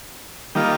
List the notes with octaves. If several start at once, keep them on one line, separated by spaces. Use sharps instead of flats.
D#3 G3 A#3 F4